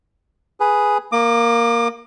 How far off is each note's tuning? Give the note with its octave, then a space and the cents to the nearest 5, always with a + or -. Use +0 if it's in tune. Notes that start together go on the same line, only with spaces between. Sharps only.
G#4 +0 B4 +0
A#3 +0 D6 +35